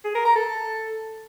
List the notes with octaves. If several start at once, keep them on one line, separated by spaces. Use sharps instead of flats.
G#4
A#4
A#5
A4